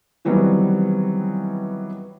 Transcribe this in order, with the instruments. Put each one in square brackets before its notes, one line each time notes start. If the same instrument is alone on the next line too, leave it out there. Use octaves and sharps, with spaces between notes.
[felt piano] D#3 E3 F#3 G3 B3 C4